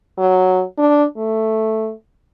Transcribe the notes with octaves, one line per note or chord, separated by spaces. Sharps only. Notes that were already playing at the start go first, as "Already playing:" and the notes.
F#3
D4
A3